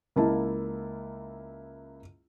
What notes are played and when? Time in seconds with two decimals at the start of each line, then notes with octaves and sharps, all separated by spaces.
0.16 C#2 A#3 E4 A5